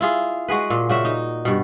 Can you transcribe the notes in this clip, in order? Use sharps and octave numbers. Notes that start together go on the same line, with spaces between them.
E4 F4 G#4
G#3 F#4 G#4 B4
A#2
C#3 F#4 E5
D#4
G2 B2